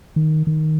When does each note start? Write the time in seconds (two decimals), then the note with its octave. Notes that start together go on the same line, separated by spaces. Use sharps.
0.16 D#3
0.47 D#3